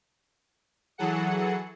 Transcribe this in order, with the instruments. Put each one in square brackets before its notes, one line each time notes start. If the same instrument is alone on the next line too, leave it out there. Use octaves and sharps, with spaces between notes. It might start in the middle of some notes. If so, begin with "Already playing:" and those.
[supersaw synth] E3 F#3 G#4 A4 F#5 C#7